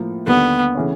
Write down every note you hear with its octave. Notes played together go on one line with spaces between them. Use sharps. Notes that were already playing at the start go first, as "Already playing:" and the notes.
Already playing: A2 F3 A#3
D#2 D3 G3 A#3 B3 D4
C#3 E3 A3 C#4